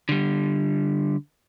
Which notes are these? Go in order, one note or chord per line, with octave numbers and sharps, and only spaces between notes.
D3 G3